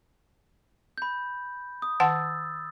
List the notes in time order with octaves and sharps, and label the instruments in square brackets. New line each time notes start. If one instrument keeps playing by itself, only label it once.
[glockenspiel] B5 G6
D#6
[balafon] D#3 F#5 A5 [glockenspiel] E6 A6